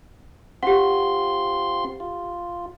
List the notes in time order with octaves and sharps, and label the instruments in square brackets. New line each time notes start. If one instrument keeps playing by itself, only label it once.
[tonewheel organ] C4 F4 C6 [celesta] G4 F#5
[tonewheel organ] F4